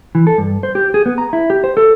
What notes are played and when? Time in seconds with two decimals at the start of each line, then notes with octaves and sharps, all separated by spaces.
0.15 E3
0.27 A4
0.38 G2
0.63 C5
0.75 G4
0.94 G#4
1.06 B3
1.18 A#5
1.33 E4
1.50 G4
1.64 C5
1.77 A4